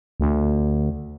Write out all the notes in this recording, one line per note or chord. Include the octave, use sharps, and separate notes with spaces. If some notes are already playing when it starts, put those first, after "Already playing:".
D2